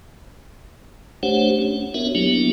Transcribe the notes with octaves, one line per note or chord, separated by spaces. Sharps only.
A3 D4 G4 C5 C#5 F#5
C#4
B3 D4 F#4 A#4 C#5 E5
F#3 A#3 B3 D4 E4 G4